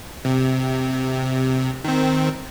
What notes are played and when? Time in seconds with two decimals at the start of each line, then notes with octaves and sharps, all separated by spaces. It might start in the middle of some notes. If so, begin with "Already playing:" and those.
0.25 C3
1.84 D#3 C4